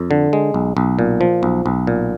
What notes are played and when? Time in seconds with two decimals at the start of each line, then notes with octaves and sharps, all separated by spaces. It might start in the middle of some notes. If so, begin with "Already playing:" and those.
Already playing: F2
0.11 D3
0.33 G#3
0.54 B1
0.77 B1
0.99 A#2
1.21 F3
1.43 B1
1.66 B1
1.87 A#2